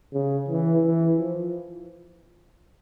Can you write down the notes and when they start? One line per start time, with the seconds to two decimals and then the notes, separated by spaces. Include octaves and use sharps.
0.14 C#3
0.49 E3
0.84 E3
1.19 F3